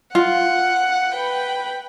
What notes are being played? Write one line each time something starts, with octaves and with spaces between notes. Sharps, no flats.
F4 F#5
B4 G5 B5